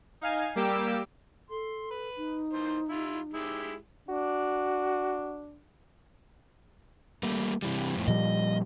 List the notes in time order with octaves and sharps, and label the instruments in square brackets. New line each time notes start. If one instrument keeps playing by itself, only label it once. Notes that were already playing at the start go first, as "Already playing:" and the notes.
[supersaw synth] D#4 F5 G#5
G3 A#3 G4 D6 E6
[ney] A4 [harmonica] C6
[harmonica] B4
[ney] D#4
[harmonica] E3 A#3 C5
G3 E4 F4
G#3 E4 G4
[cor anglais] D4 [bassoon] F#4
[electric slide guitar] G3 A3 A#3
C3 E3 G3
F2 A2
[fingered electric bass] A#2 F3 G3 [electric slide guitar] D#5